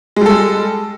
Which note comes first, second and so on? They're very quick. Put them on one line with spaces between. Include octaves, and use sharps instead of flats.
G#3 G3 A4